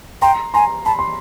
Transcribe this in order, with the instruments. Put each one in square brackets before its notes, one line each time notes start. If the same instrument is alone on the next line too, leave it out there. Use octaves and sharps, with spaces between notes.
[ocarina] G5 [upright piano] A#5 C6
[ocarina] G#5 [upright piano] A#5 C6
[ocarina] A5 [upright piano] B5
[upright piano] C6